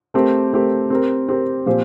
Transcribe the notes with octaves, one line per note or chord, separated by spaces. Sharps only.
A3 C4 G4 A#4
A3 C4 G4 A#4
C4 G4 A#4
C4 G4 A#4
A#2 F3 C4 G4 C5